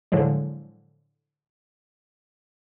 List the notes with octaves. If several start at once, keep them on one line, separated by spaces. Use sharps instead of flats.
A2 D3 F3 F#3 G#3